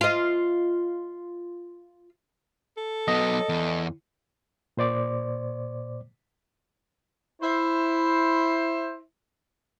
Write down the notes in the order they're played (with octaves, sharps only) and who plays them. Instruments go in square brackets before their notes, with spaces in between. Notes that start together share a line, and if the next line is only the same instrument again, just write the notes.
[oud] F4 D#5
[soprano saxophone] A4
[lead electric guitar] F#3 B3 [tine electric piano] D#5
[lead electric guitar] E2
[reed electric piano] A#2 C5 D5 D6
[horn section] E4 C5